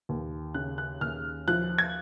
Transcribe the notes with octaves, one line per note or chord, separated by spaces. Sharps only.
D#2
C#3 F#6
F#6
D#2 F6
F3 F#6
G#6